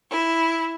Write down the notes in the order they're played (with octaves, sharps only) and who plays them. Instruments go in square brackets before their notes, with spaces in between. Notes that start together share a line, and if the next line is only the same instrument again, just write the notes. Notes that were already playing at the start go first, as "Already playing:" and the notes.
[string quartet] E4